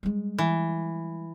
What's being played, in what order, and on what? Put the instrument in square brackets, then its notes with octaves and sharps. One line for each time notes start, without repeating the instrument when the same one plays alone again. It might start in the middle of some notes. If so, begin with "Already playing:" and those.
[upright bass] G3 G#3
[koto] E3